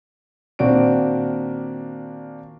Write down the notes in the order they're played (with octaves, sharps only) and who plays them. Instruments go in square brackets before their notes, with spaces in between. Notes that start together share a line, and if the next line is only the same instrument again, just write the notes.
[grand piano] A#2 D#3 C4 D4 F#4 D7